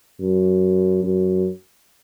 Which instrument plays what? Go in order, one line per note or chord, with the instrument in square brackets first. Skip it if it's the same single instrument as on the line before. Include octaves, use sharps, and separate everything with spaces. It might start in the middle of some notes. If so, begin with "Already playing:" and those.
[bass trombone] F#2
F#2